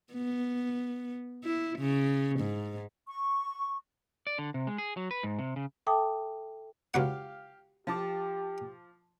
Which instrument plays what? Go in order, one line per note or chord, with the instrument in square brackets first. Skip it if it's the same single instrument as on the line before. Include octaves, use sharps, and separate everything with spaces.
[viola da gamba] B3
E4
C#3
G#2
[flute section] C#6
[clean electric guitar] D5
D3
C3
G#3
G#4
F#3
B4
G#2
C3
C#3
[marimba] A4 E5 G5 A5 D6 D#6
[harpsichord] C#2 F#3 F#5 [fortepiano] G4 F5
[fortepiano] F3 A5 D6 [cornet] G4